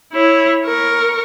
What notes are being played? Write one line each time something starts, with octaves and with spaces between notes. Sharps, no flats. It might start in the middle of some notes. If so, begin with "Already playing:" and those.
E4 C#5
A#4 C#6